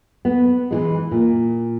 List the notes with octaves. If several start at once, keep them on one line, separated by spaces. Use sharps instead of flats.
B3
E3 F#3 G#3
A#2